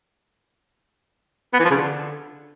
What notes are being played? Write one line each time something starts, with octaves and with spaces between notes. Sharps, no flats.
B3
E3
F3
C#3
D3